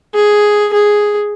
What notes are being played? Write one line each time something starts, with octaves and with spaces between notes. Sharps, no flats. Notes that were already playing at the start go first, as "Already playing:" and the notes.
G#4
G#4